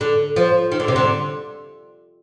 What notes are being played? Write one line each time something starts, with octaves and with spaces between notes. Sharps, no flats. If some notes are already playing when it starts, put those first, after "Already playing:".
D3
F3
D#3
D3
C3
D3